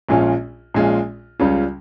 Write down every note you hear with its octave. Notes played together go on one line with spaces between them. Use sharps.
A#1 A#2 G#3 C#4 F4
A#1 A#2 G#3 C#4 F4
C#2 C#3 G3 C#4 F4